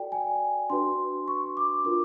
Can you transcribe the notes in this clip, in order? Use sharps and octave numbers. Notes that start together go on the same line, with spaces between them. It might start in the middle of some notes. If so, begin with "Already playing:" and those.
Already playing: F#4 A4 D5 G5
G#5
D4 F#4 B4 C6
C#6
D6
D4 F4 A#4 D6